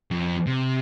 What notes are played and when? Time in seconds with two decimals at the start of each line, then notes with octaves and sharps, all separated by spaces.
0.11 F2
0.47 C3